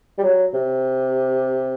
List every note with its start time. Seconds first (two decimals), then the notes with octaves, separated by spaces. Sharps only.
0.18 G3
0.23 F#3
0.54 C3